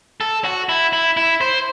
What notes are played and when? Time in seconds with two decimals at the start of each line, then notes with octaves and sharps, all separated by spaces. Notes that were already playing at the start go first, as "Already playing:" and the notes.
0.21 A4
0.45 F#4
0.69 E4
0.93 E4
1.17 E4
1.41 C5